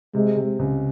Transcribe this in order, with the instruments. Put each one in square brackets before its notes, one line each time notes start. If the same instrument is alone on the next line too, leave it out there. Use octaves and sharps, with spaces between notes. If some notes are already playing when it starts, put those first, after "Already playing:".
[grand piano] C3 [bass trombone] G#3
[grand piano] C3
C#2